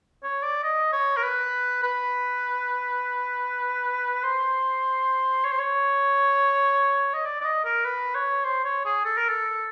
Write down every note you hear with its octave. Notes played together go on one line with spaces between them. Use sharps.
C#5
D5
D#5
C#5
A#4
B4
B4
C5
C#5
C5
C#5
D#5
D5
D5
D#5
A#4
B4
C#5
C5
C#5
G#4
A4
A#4
A4